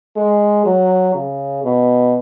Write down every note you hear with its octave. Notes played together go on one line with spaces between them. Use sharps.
G#3
F#3
C#3
B2